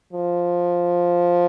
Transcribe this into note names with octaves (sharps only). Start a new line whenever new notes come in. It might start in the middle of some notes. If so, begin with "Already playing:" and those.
F3